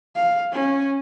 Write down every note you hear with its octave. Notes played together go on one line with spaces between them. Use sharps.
F5
C#4